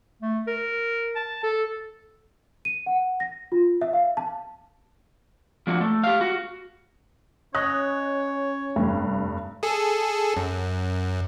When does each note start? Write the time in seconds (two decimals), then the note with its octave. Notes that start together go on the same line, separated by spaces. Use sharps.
0.22 A3
0.47 A#4
1.16 A5
1.44 A4
2.65 D#7
2.86 F#5
3.20 A#6
3.52 F4
3.81 E5
3.93 F5
4.17 A5
5.67 F3 A#3 F#4
5.81 A3
6.04 G4 F5
6.21 F#4
7.55 C#4 C#5 D#5 F#6
8.76 F1 G2 G4
9.63 G#4 A4
10.37 F#2